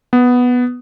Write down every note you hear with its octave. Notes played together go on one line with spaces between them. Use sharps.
B3